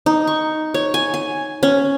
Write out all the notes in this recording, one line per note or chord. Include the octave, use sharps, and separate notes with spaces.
D#4
C#6
C#5
G#5
G#5
C#4